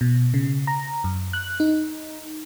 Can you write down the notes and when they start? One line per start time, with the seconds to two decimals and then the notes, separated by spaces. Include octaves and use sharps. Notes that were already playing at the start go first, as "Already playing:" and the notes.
0.01 B2
0.34 C#3
0.67 A#5
1.04 F#2
1.33 F#6
1.60 D#4